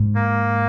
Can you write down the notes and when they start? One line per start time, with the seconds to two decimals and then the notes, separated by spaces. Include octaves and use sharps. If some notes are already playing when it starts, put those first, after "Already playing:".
Already playing: G#2
0.15 A#3